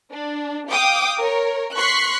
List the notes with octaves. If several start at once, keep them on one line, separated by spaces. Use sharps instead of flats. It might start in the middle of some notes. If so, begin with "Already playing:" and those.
D4
F5 G5 D6 D#6
A#4 C#5
C6 C#6 F#6 B6 C7